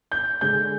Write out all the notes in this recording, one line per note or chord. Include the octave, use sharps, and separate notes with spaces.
G6
D3 G#3 G6